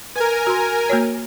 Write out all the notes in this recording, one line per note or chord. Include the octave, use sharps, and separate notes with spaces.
A#4 B4 G#5
F#4 C6
A#3 F#4 C#5